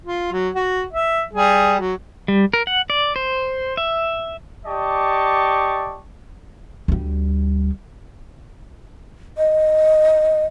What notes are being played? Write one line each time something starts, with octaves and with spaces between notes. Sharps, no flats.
F4
F#3
F#4
E5
G3 G#4
F#3
G3
A#4
F#5
D5
C5
E5
G4 D5 D#5 A5 C#6
D2 G3
D#5